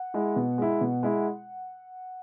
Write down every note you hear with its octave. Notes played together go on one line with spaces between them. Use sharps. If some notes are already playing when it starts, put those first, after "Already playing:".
Already playing: F#5
G#3 E4
B2
G#3 E4
B2
G#3 E4